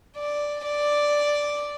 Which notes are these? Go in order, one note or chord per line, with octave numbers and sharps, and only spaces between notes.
D5
D5